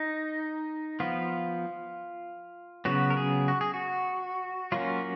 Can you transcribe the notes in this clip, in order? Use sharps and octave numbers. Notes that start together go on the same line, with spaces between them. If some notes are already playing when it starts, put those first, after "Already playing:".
Already playing: D#4
F3 B3 F4
C#3 F#3 B3 F#4
A#4
G#4
F#4
G#4
F#4
F#3 A#3 C#4 F4